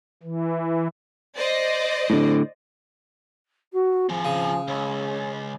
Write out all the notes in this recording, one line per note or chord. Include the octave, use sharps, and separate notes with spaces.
E3
C5 D5 D#5
A2 D3
F#4
F3 C4 G#4
C#3
C#2 C#5